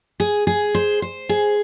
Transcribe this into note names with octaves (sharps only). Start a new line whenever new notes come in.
G#4
G#4
C5
C5
G#4